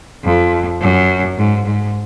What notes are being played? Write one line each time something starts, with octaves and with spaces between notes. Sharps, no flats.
F2
F#2
G#2
G#2